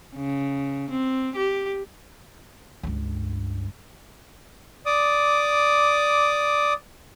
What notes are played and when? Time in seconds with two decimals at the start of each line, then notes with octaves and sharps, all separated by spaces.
0.16 C#3
0.91 C4
1.36 G4
2.83 C#2 G2
4.86 D5 D6 D#6